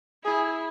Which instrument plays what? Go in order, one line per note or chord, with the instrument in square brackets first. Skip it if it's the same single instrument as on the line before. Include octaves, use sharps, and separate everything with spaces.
[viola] E4 [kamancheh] G#4